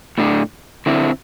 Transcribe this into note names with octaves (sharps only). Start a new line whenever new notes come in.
A2 A3 D4
D3 C4 E4